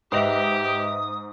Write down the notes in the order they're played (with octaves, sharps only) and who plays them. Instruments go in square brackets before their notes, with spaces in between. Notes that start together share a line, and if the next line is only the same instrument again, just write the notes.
[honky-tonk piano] G#2 F7 [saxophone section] G4 [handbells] B4 D#5 E5 [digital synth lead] D#6